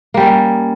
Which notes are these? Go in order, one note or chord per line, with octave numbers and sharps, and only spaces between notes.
G3 A#3 C#4